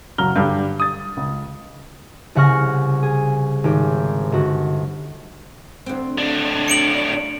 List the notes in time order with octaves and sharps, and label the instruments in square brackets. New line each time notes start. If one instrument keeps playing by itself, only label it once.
[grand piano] F#1 F#3 A#5 F6 G7
G2 D3 D4 G4
D#6 A6
C#2
[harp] C2 C#3 F#5 C#6 F6 A#6
G#4
G#1 G4
G1 F#4
[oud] D2 C4
[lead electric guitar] A2 D4
[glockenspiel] C#7 D7 F#7